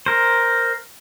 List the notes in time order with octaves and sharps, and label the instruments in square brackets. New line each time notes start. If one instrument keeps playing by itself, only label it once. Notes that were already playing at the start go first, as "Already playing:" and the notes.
[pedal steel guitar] A#4 C5